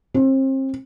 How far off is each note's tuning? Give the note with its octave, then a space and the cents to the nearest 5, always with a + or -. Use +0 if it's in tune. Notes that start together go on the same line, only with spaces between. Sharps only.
C4 +35